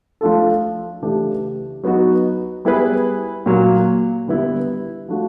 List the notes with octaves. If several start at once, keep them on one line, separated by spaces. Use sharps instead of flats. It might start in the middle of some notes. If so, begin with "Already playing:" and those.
F3 A3 D4 F4 A4
C#3 E3 A3 D4 G4
F#3 B3 D#4 F#4
G3 B3 E4 G#4 B4
A#2 F#3 A#3
D3 G3 B3 E4
F3 A3 D4 F#4